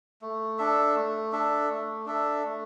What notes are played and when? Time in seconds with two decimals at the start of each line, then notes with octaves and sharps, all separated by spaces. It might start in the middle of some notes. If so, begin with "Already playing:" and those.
0.22 A3
0.58 D4 A4 E5
0.95 A3
1.32 D4 A4 E5
1.69 A3
2.06 D4 A4 E5
2.44 A3